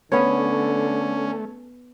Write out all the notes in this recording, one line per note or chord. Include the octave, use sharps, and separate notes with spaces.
D3 A3 B3 C#4 C#5